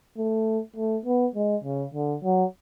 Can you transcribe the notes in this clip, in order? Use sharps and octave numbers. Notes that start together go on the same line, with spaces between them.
A3
A3
B3
G#3
C#3
D3
F#3